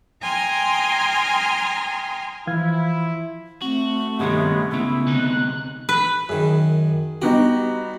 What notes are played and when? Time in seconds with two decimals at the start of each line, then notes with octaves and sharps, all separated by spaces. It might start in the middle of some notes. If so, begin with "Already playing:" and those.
0.22 G5 G#5 A#5 C6 D#6 F6
2.47 E3 F3 E4 F5 G#6
3.62 A3 C4 F#4
4.20 G2 C3 D#3 G#3 B3 C#4 G4
4.71 C#2 C#3 B3 E4
5.07 D2 C3 D#4 F#6
5.89 B4
6.29 F#2 D#3 G#4
7.22 G3 B3 D#4 F#4 G4